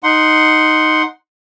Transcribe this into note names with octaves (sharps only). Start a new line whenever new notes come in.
D#4 F#5 C6